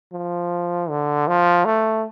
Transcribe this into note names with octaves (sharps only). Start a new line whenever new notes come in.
F3
D3
F3
A3